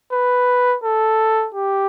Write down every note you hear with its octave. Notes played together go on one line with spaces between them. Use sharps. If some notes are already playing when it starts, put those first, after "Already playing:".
B4
A4
G4